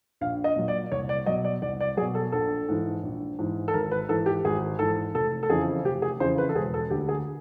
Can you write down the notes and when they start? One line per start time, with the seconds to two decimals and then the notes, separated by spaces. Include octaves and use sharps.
0.21 A#1 F5
0.44 D#5
0.56 A#2 F#3
0.68 D5
0.92 C2 C#5
1.09 D5
1.26 B2 F#3 D#5
1.44 D5
1.62 C2 D5
1.80 D5
1.97 F#3 G#4
2.01 B2
2.15 A4
2.32 A#1 A4
2.69 G#2 E3
3.03 A#1
3.39 G#2 E3
3.68 A4
3.74 G#1 A#4
3.91 B4
4.08 G#2 E3 A4
4.26 G4
4.45 G#1 G#4
4.79 G#2 E3 A4
5.15 F1 A4
5.43 A4
5.50 F2 C#3 E3 G#4
5.85 F1 G4
6.02 G#4
6.20 F2 C#3 E3 C5
6.38 B4
6.49 A4
6.55 E1 G#4
6.74 A4
6.90 D2 D3 G4
7.09 G#4